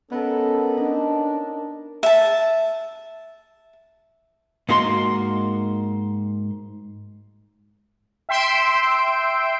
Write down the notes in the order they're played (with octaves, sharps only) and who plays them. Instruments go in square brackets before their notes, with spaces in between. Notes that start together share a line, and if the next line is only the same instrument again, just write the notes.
[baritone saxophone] B3 [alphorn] C#4 [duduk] A4 [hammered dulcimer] A#4 D#5
[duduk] D4 [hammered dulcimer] D#4
[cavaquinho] E5 A5
[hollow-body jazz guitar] G#2 A#3 F#4 B5 C6
[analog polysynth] E5 G5 C6 E6 D7